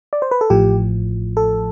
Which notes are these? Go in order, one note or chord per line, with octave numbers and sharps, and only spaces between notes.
D5
C5
B4
A4
A1 A2 F3 G4
A4